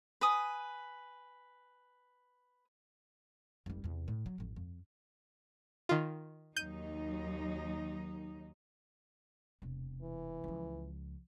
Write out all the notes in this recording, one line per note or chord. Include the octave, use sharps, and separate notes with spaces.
B4 G#5 D#6
F1 G3
E2 C3
A2
F#3
A1 F2
F2
D#3 F4
D#2 F#3 D#4 G6 D#7
E1 C3
E3
C#2 F3